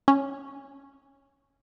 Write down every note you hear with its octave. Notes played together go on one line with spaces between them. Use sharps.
C#4